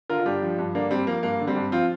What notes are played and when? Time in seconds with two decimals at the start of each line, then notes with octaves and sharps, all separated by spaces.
0.10 D3 F4 A#4
0.20 F4
0.26 G2 D4 G4
0.42 F3
0.59 G2
0.74 D3 A#3 D4
0.91 G2 G3 C4
1.07 F3 A#3
1.23 G2 A#3
1.40 D3
1.47 G3 C4
1.56 G2
1.72 F3 C4 F4